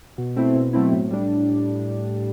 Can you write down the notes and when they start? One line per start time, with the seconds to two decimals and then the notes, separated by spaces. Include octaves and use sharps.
0.18 B2
0.36 A3 C4 E4
0.55 B2
0.73 F#3 A3 C4 E4
0.92 A2
1.11 G3 D4